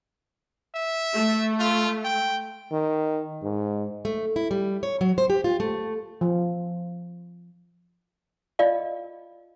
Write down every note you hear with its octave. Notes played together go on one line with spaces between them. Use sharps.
E5
A3
F4
G5
D#3
G#2
A3
E4
G3
C#5
F#3
C5
G4
F4
A3
F3
F4 D5 D#5 F5